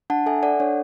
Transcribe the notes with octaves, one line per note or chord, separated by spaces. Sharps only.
D4 F#5 A5
A4 E5 G#5
A4 D5 F#5
D4 C#5